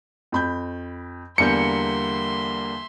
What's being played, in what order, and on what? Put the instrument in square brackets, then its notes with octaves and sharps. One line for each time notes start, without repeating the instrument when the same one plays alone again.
[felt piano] F2 B5 G6
[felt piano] E2 G6 [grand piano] D3 G3 A#3 [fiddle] E5 C6 [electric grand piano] C#7